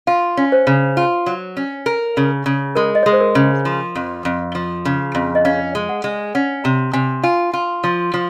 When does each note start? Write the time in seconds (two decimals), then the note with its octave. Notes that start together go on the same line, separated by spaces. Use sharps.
0.07 F4 F5
0.37 C#4
0.52 C5
0.67 C#3
0.97 F4
1.26 F#3
1.57 C#4
1.86 A#4
2.17 C#3
2.46 C#3
2.75 G#3 A#4
2.95 D#5
3.03 G#3 C#5
3.13 C5
3.21 A#4
3.35 C#3
3.65 F3
3.96 F2
4.25 F2
4.55 F3
4.85 C#3
5.15 F2
5.35 D#5
5.45 C#4 F5
5.75 G#3
5.89 F#5
6.04 G#3
6.35 C#4 F#5
6.64 C3 A#5
6.93 C3 G#5
7.23 F4 G#5
7.53 F4
7.84 F3
8.14 F3